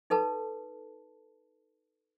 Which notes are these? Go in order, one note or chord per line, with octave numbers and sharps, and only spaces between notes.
D#4 A4 B4 A5